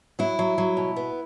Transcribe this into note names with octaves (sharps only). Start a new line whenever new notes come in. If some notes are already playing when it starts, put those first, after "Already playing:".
F#3 E4
F#3
F#3
B2
B3